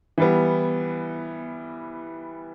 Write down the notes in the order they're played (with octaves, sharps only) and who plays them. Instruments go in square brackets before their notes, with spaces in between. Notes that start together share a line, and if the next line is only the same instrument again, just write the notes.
[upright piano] E3 G3 B3